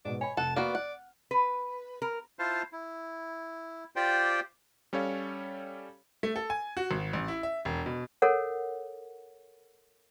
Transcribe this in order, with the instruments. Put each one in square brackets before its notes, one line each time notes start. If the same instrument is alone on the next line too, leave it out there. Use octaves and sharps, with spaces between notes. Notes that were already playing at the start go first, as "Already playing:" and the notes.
[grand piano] G#2 B2 [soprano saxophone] D5
[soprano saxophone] C#5 [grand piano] G#5 B5
[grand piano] F1 [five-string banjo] F#5 [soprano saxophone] A5
[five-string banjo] A#3 B3 F#4 [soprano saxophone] D5 [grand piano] F6
[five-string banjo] F#5
[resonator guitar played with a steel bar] B4
A#4
[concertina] E4 F4 C5 F5 A5
E4
F4 G4 C5 D5 G5
[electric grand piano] G3 C#4 A4 C#5 F5
[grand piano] A3
A4
G#5
F#4
G#1
A1
E4
E5
E1
B2
[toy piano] A4 A#4 C#5 F#5